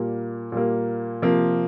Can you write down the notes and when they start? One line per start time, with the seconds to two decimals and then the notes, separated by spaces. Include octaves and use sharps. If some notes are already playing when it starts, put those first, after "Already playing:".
Already playing: A#2 G3 A#3
0.52 A#2 G3 A#3
1.22 C3 F3 A#3